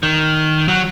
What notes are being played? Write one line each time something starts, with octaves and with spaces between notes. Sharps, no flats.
D#3
F#3